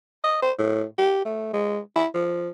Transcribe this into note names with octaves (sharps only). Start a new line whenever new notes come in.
D#5
C5
A2
G4
A3
G#3
E4
F3